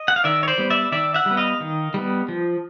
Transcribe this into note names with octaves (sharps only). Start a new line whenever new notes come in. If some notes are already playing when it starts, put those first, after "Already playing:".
Already playing: D#5
F#5
F5
D#3 D5 E5
C#5
C5 D5
G3 B3
D5 E5
D#3 D5 E5
E5 F#5
G3
B3
D#5 F5
D#3
G3 B3
F3